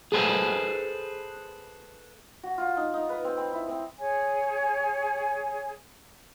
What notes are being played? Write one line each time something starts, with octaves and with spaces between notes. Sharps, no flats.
G#4 A4 B4 C5 G#5
F#4
F4
D#4
D#4
B4
C4
C4
E4
C4
G#4 C#5 G#5